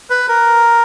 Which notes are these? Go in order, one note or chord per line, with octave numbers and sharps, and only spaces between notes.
B4
A#4